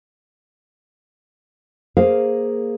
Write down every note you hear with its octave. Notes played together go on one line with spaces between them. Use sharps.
A#3 G#4 A#4 C5 F5